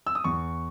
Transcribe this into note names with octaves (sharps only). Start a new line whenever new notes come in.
E6
D#6
E2 C#6